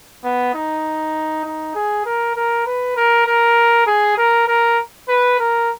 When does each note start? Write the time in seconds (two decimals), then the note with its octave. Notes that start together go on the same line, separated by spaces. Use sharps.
0.24 B3
0.55 D#4
1.45 D#4
1.75 G#4
2.06 A#4
2.36 A#4
2.66 B4
2.96 A#4
3.27 A#4
3.87 G#4
4.18 A#4
4.48 A#4
5.09 B4
5.39 A#4